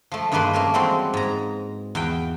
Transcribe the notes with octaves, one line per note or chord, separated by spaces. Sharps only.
F3 A3
G2 D#3 G#3 A#3 B4 C6
A3 A#3 C#4 A#4
E3 G3 G#3 C4 F#4 C5
G#2 A#5
E2 G5